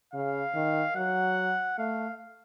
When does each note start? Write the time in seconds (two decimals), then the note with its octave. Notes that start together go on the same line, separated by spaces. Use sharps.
0.14 C#3 F5
0.55 D#3
0.96 F#3 F#5
1.78 A3 F5